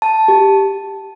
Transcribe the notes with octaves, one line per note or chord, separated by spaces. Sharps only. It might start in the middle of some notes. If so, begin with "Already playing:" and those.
A5
G4